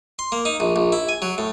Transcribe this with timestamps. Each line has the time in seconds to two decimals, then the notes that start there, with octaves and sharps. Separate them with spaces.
0.19 C6
0.32 A#3
0.45 D#4
0.60 A#1
0.76 A#1
0.92 E4
1.09 G#5
1.22 F#3
1.38 A2